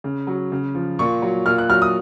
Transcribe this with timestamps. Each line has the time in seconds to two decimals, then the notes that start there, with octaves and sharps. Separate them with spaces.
0.04 C#3
0.27 F#3
0.52 C#3
0.75 F3
0.99 A#2 C#6
1.22 F#3
1.46 A#2 F6
1.58 F#6
1.69 F#3 F6
1.82 D#6